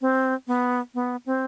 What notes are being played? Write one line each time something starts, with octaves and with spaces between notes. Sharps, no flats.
C4
B3
B3
C4